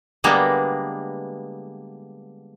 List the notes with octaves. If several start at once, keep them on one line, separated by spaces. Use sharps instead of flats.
D3 G3 G#3 A#3 B3